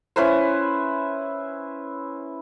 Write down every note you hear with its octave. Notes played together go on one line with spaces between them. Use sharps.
C#4 E4 B4 C5